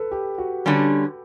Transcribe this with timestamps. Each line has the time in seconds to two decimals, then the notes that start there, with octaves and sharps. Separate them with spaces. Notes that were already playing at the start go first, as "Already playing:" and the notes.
Already playing: A4 B4
0.11 G4
0.38 F#4
0.66 D3 G3 C#4